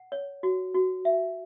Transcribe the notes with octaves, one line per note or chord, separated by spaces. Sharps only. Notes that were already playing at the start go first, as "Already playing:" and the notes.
Already playing: F#5
C#5
F#4
F#4
E5